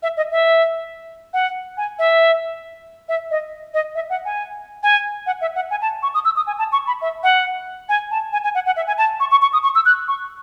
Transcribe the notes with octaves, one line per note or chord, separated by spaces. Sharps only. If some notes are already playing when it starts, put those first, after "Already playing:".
E5
D#5
E5
F#5
G#5
E5
E5
D#5
D#5
E5
F#5
G#5
G#5
F#5
E5
F#5
G#5
A5
C#6
D#6
E6
D#6
G#5
A5
C#6
B5
E5
F#5
G#5
A5
G#5
G#5
F#5
F#5
E5
G#5
A5
C#6
C#6
C#6
D#6
C#6
E6
F#6
C#6